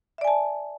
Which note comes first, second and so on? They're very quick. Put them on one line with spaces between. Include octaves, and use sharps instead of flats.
E5 D5 G#5 A5